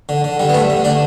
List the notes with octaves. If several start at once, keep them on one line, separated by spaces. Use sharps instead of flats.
D3
D3
D3 G3
B3
G2 A3
D3
D3 D4